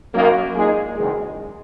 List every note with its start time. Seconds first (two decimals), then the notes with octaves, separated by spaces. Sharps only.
0.14 F#2 D#3 A#3
0.55 A#2 G#3 D#4 G#4
0.96 F#1 E2 D#3 G#3